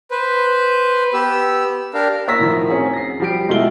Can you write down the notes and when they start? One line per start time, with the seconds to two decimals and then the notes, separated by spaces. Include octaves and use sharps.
0.11 B4 C5
1.14 B3 G4 E6
1.94 D4 G4 A#4 F5
2.27 A#3 C#5 E6 A#6 B6
2.39 A2 D#3 F3
2.70 C4 C#4 G#4
2.93 A#6 C7
3.20 F3 G3 G4 C7 D7
3.49 B2 G#3 A3 E4 F4 G7